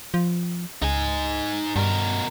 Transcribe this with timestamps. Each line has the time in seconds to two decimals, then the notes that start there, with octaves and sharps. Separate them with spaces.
0.14 F3
0.82 C#2 D#4 G#5
1.76 G2 B2 A#4